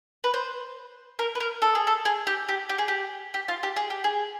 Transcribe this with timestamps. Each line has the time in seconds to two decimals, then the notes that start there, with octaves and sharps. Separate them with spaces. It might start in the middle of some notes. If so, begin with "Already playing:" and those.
0.24 B4
0.34 C5
1.19 A#4
1.35 B4
1.40 A#4
1.62 A4
1.75 G#4
1.87 A4
2.05 G#4
2.27 G4
2.49 G4
2.69 G4
2.78 G#4
2.88 G4
3.34 G4
3.48 F4
3.63 G4
3.76 G#4
3.90 G4
4.04 G#4